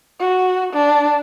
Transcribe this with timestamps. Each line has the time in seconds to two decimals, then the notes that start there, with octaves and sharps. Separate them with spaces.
0.20 F#4
0.73 D4